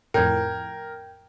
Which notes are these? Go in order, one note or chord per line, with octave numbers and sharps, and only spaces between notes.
F2 A2 A#4 G5 G6 G#6